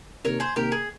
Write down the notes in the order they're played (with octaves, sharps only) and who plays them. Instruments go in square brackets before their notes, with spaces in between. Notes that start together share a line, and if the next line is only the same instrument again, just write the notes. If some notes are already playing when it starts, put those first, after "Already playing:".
[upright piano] C3 D#3 A#3 [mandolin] A#4 C#5
[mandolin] G#4 C5
[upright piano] C3 D#3 A#3 [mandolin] G4 A#4
[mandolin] G#4